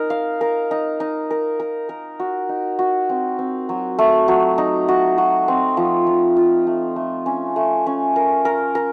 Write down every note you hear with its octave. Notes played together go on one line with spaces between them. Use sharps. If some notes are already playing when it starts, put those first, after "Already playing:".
Already playing: D#4 A#4
F5
A#4
D#4
D#4
A#4
A#4
A#4
F#4
D#4
F#4
C4
C4
F#3
A3
F#3
D#4
F#4
F#4
C4
F3
F3
F4
A3
A3
C#4
A3
C#4
A#4
A#4
A#4